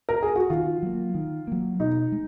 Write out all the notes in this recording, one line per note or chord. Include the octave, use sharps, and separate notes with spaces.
A#4
G#4
F#4
D#3 F4
F#3 A#3
D#3
F#3 A#3
B2 D#4
G#3